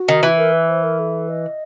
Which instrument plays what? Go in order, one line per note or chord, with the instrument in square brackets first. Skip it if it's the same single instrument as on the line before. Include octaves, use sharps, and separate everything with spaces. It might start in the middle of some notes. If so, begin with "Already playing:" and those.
Already playing: [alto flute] F#4
[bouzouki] D#3
E3
[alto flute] A#4
B4
C5
A#4
A4
D#5